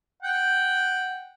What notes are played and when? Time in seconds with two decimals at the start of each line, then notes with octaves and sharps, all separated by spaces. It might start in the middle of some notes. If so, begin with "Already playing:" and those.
0.23 F#5 G5